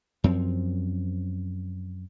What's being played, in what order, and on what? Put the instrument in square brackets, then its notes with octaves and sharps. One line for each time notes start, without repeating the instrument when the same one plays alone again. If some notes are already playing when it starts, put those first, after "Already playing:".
[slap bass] F#2 F3 C4